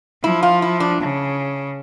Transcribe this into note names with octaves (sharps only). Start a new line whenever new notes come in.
F3 E4
F4
E4
D4
C#3